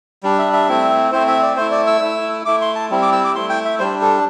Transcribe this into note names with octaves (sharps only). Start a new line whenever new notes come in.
G3 D4
E5
E5
A3 C4 E4
A3 C4 E4 C5
E5
D5
A3 E4 C5
D5
E6
A3 E4
A3 E4 D6
C6
A5
G3 C4 E4
D6
E6
D6
A3 E4 C6
G5
E5
G3 D4 C5
A4